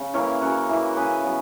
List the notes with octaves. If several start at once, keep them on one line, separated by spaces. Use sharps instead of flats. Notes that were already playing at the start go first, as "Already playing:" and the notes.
Already playing: C#3
E3 A#3 E4 A#4 C#5
C#3 F#4 A#4
E3 A#3 E4
C#3 G#4 B4
F#3 B3